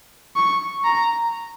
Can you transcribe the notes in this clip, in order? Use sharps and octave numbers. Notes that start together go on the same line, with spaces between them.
C#6
A#5